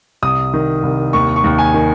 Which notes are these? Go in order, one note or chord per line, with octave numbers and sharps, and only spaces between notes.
C2 D#6
D#3
C2
D#2 C#6
C#6
D#2
G#5
D#3